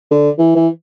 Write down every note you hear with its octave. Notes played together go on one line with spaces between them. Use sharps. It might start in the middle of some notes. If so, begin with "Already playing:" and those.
D3
E3
E3